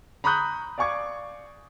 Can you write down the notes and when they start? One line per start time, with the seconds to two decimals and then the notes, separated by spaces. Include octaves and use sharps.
0.24 A#5 B5 C#6 D#6 F#6 G6
0.78 D5 F5 G#5 C#6 D6 G#6